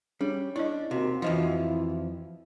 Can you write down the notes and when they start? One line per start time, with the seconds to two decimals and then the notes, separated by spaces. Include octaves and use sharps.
0.21 G3 C#4 G#4
0.56 D4 E4 C#5 D#5
0.91 D#2 C3 F#4
1.22 F2 E3 F3 D#4 E4 C5 D#5